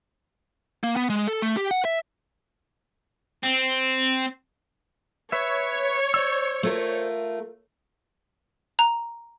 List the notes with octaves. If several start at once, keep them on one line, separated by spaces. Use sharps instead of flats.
A#3
B3
G#3
A4
A3
G4
F#5
E5
C4
B4 C#5 E5
C5 D5 E6
A3 F4 A#4
A#5